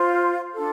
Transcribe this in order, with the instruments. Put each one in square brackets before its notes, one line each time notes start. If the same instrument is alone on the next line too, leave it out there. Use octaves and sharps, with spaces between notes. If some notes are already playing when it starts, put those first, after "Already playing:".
Already playing: [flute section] F4 C5 F5 C6
D4 F4 A4